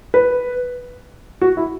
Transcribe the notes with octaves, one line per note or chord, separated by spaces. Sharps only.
B4
F#4
E4